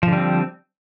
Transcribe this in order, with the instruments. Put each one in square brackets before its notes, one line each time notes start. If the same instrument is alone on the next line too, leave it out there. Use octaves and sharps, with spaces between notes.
[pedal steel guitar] F3
D3
G3
C4